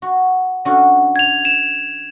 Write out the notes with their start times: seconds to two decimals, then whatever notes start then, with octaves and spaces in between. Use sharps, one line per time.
0.02 F#4
0.65 D3 C#4 F#4
1.16 G#6 F7
1.45 E7